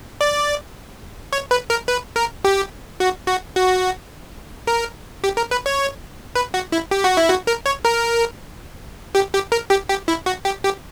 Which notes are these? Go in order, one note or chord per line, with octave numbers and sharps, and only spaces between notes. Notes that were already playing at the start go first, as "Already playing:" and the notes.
D5
C#5
B4
A#4
B4
A#4
G4
F#4
F#4
F#4
A#4
G4
A#4
B4
C#5
B4
F#4
E4
G4
F#4
E4
F#4
A#4
C#5
A#4
G4
G4
A#4
G4
G4
E4
F#4
G4
G4